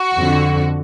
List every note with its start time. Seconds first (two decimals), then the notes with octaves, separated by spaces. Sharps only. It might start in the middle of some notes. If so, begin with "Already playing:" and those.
Already playing: F#4
0.16 F2 D3